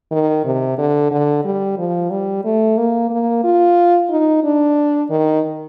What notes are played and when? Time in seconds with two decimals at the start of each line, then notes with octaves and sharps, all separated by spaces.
0.12 D#3
0.45 C3
0.78 D3
1.11 D3
1.45 G3
1.78 F3
2.11 G3
2.44 A3
2.77 A#3
3.10 A#3
3.44 F4
4.10 D#4
4.44 D4
5.10 D#3